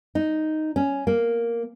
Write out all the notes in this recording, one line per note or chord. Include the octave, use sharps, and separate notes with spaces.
D#4
C#4
A#3